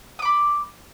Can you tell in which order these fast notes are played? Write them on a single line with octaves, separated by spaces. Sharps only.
D#6 D6 B5